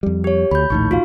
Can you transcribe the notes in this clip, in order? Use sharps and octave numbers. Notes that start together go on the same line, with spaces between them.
F2 G3
G4 C#5
D2 B5 G6
A#1 D#2 A2 D#4 C#6
F4 F#4 F5